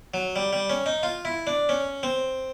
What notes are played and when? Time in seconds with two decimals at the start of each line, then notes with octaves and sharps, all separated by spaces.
0.14 F#3
0.36 G3
0.53 G3
0.70 C#4
0.86 D#4
1.03 F4
1.25 E4
1.47 D4
1.69 C#4
2.03 C4